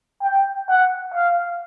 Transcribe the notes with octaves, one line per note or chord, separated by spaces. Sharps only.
G5
F#5
F5